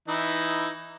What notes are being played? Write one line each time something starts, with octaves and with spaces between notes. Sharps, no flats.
E3 D#4 E4